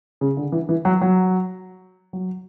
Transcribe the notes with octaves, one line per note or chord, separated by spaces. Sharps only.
C#3
D3
E3
E3
F#3
F#3
F#3